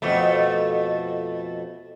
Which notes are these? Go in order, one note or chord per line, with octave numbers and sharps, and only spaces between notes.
F2 B2 A3